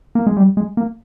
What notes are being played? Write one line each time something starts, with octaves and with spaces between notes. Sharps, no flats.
A#3
G#3
G3
G#3
A#3